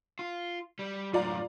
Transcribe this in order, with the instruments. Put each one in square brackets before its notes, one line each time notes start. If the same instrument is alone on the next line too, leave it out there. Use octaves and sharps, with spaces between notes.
[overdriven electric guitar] F4
G3
[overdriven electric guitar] F#2 A2 [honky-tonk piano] F4 D5 A#5